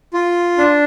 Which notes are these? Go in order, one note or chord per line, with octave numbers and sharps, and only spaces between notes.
F4
D4